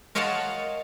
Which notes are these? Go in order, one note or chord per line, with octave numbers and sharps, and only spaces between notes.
A#4 C#5 D#5 F5 F#5 A5